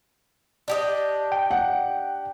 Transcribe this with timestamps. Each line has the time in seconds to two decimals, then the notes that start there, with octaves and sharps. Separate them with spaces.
0.68 D4 G4 D#5
1.32 G5
1.51 F#5